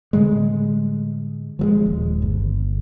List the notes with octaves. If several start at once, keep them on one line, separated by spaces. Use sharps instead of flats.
A2 D3 G3 G#3
F3 F#3 G#3
D#1
G1